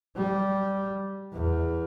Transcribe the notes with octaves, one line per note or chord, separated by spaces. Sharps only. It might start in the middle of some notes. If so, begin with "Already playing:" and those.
G3
E2